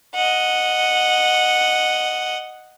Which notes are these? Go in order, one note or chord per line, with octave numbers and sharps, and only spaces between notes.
D#5 F#5